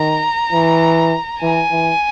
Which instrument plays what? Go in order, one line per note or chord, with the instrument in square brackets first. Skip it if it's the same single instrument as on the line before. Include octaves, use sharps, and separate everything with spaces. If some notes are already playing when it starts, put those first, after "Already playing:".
Already playing: [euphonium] D#3 [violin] A#5
[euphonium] E3
[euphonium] E3 [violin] G#5
[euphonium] E3